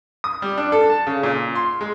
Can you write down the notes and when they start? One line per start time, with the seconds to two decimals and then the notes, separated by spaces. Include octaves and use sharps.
0.24 D#6
0.42 G3
0.58 D4
0.72 A4
0.90 A5
1.07 C#3
1.23 A#2
1.55 C6
1.81 G#3